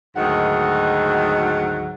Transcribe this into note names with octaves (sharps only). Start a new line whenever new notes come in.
D2 G#2 D#3 F#3 D#4 F#5